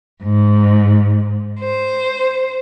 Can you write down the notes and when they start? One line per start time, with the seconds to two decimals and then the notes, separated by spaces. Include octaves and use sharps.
0.21 G#2
1.60 C5